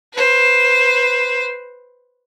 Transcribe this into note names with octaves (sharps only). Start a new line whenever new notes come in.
B4 C5